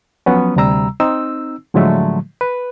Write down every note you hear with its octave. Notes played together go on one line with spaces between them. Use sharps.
F3 F#3 B3 C#4
D2 C3 G3 A#5 E6
C4 D#4 E6
A2 D3 F3 F#3 G#3 A3
B4